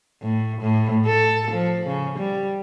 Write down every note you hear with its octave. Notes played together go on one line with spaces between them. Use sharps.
A2
A2
A4
F3
C#3
G3